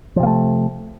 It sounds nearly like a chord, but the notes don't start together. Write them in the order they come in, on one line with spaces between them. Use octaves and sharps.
F3 C3 A#3 A3